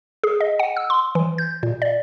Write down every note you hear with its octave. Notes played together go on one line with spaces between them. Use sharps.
G#4
D#5
F#5
E6
C6
E3
G6
A#2
D5